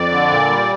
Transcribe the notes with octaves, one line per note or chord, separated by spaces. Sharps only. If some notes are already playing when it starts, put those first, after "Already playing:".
Already playing: F2 D5
D3
A#2
G3